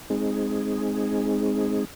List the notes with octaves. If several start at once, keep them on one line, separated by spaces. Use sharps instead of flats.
G#3 C4 D#4 G#4